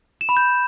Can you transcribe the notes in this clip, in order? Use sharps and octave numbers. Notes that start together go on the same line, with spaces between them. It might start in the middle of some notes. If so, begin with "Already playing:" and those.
E7
B5
G6